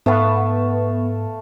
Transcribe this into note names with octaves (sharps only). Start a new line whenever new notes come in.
G#2 A3 B3 F5 A5